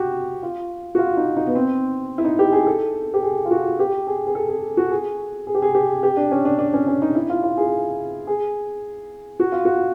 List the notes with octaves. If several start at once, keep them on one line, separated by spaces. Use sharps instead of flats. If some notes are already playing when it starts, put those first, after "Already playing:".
Already playing: F#4 G4
F4
F#4
F4
D#4
D#4
B3
C4
E4
D#4
G4
G#4
A4
G4
G#4
F4
F#4
G4
G#4
G#4
A4
G#4
F#4
G#4
G#4
G4
G#4
G4
G4
D4
C#4
D4
D4
C#4
C#4
D#4
E4
F4
F4
G#4
G#4
F#4
F4
F#4